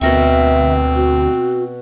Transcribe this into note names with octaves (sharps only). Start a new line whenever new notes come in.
D2 B2 C4 A#4 E5 C#6
F#4